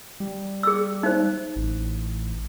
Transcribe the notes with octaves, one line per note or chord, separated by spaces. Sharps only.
G3
G#4 E6
D#4 C5
A1